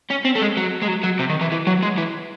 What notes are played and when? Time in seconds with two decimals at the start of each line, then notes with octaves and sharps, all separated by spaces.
0.10 C#4
0.25 C4
0.35 A3
0.41 G#3
0.57 F#3
0.83 G#3
0.89 F#3
1.04 F#3
1.19 C3
1.30 D#3
1.41 E3
1.52 E3
1.67 F#3
1.83 G#3
1.98 E3